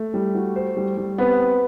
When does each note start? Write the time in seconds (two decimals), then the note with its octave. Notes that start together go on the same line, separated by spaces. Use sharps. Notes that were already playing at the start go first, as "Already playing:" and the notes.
Already playing: A3
0.14 G3
0.35 F#4
0.56 C5
0.77 G3
0.97 G3
1.18 B3 C4
1.40 C4